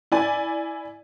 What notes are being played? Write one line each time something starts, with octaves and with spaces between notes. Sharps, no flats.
E4 D5 G#5